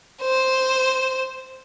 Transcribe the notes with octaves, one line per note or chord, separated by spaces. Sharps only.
C5